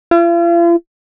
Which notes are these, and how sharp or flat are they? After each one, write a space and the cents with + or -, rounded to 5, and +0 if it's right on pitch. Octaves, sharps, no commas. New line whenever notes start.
F4 -45